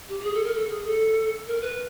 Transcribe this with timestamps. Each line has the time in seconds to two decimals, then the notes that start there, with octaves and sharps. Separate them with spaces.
0.08 G4
0.19 G4
0.23 G#4
0.34 A4
0.44 A#4
0.54 A4
0.70 G#4
0.85 A4
1.47 A#4
1.61 B4